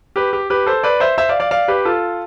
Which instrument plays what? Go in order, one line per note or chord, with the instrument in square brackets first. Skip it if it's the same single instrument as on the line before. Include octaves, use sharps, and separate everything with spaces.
[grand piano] G4 B4
G4
G4 B4
A4 C5
B4 D5
C5 E5
C5 E5
D5 F5
D5 F5
D5 F5
G4 B4
F4 A4